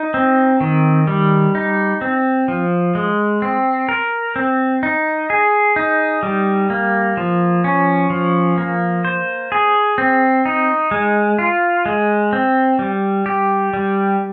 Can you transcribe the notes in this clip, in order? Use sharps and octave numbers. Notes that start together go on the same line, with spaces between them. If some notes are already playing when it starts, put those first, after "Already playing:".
Already playing: D#4
C4
D#3
G3
D#4
C4
F3
G#3
C4
A#4
C4
D#4
G#4
D#4
G3
A#3
F3
C#4
F3
A#3
C5
G#4
C4
D#4
G#3
F4
G#3
C4
G3
G4
G3